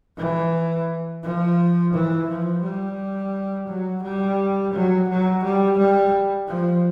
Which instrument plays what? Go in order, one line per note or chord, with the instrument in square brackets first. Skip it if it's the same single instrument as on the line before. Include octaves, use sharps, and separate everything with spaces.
[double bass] E3
F3
E3
F3
G3
F#3
G3
F#3
F#3
G3
G3
F3